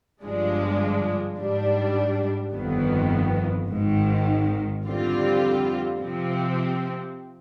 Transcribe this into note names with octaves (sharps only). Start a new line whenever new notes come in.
G1 G2 F3 G#3 D4
G#2 G3 D4
G1 F2 D#3 B3
G#1 G#2 D#3
F2 D3 G3 C4 F4
C3 F3 C4